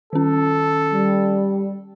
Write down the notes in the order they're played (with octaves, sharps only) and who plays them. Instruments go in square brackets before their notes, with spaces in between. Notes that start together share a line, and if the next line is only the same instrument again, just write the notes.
[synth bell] D#3 C#4 [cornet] A4
[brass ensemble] G3